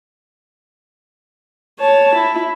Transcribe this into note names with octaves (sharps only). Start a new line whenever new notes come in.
C#5 A5
E4